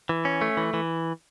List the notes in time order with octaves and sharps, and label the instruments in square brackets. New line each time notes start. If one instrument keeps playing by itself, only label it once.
[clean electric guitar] E3
C#4
A3
E3
E3